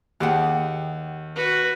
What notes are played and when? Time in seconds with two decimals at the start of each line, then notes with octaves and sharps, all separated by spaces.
0.20 D#2 G4 G#4 F#5
1.36 F#4 B4